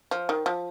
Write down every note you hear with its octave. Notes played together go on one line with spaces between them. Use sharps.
F3
D#3
F3